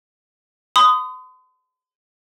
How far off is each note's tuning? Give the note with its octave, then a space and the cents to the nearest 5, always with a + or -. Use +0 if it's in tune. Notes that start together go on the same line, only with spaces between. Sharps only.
C6 -45 D#6 +0